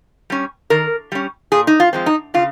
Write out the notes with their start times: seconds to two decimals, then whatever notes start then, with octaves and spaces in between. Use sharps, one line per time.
0.30 G3 C#4
0.70 D#3 A#4
1.12 G3 C#4
1.52 A#2 G#4
1.67 D#4
1.80 F4
1.93 F3 G#3 C4
2.06 D#4
2.34 C#3 F4